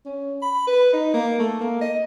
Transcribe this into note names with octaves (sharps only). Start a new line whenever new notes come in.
C#4
B5
B4
D#4
A#3
A3
A#3
D#5